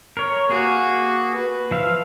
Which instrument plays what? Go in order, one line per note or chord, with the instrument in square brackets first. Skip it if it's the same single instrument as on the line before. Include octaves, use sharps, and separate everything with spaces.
[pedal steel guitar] A#4 C#5
[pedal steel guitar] A#3 G#4 [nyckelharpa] F#4
[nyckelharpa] B4
[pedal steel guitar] F3 E5 F5